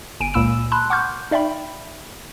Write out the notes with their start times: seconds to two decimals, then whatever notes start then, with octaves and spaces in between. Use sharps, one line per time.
0.20 G1 G#5 D7 D#7
0.34 C#2 A#2 A#3 B5 E6 E7
0.72 A5 B5 C6 F#6
0.90 F#5 C#6 D6 F6 G6
1.31 D#4 D5 E5 G5 B5